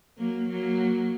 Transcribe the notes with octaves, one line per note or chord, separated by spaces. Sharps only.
F#3 A#3
F#3 A#3